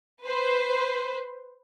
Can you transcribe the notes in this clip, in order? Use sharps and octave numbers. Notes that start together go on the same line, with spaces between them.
B4 C5